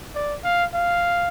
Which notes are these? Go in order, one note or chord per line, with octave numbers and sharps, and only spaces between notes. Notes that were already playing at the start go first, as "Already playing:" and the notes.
D5
F5
F5